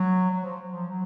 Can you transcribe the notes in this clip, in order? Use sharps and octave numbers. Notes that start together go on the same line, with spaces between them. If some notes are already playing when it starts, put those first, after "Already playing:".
Already playing: F#3
F#3
F3
F3
F#3